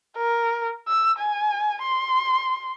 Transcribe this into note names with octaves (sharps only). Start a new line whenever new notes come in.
A#4
E6
G#5
C6